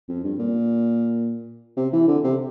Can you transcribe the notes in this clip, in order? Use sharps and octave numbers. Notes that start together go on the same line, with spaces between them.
F2
G2
A#2
C3
E3
D3
C3